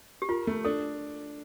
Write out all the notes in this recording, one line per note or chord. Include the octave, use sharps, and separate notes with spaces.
G4
F4 A#4
A3
D4 A4